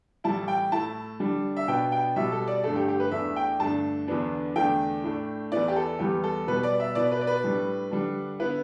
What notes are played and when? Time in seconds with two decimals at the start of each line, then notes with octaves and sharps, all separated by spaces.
0.24 A2 E3 G3 E4 A5
0.48 G5
0.72 A2 A3 E4 A5
1.20 D3 G3 D4
1.57 E5
1.68 B2 B3 D4 G5
1.92 G5
2.16 B2 G3 E4 E5
2.32 A4
2.48 D5
2.64 G2 D3 A3 A4
2.76 G4
2.88 G4
3.00 B4
3.11 E2 E3 A3 D4 E5
3.36 G5
3.60 G2 D3 A3 D4 A5
4.08 E2 D3 B3 D4
4.56 E2 D3 A3 D4 G5
5.04 A2 A3 D4
5.52 E2 E3 B3 E4 D5
5.68 G4
5.76 A4
5.99 E2 E3 G3 B3 G4
6.23 A4
6.47 B2 G3 B3 B4
6.63 D5
6.80 E5
6.95 B2 B3 E4 D5
7.11 B4
7.21 D5
7.27 B4
7.43 A2 G3 D4
7.91 D3 G3 D4
8.40 D3 B3 E4 B4